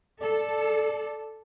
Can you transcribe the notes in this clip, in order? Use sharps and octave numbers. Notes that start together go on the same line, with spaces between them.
A4 D5